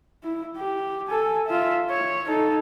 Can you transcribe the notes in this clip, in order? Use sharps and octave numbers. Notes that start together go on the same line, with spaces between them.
E4
G4
A4 G#5
F4 E5
C#5
D#4 A4